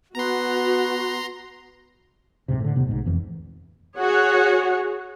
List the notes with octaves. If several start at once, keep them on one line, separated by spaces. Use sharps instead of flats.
B3 F#4 A#5 C6
D1 G#2 C3
A2 D3
D#1 C3 B3
B1 G#2
F1 F2 E3
F#4 G#4 C#5 F#5